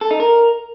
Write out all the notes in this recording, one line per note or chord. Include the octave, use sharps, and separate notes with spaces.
A4
D#4
A#4